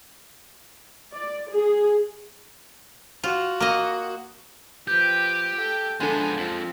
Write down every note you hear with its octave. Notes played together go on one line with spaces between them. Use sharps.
D5
G#4
F4 F#4
A#3 D#5
F3 G4 B4 G6
A4 G5
F3 G#3 B3 D4 A4 G#5
F2 F3 C4